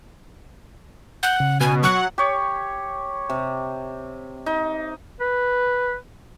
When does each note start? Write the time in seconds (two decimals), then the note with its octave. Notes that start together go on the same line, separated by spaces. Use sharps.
1.23 F#5 G6
1.40 C#3
1.60 B2 G#5
1.83 F#3 F#5 C#6
2.18 G4 C#5
3.30 C3
4.46 D#4
5.20 B4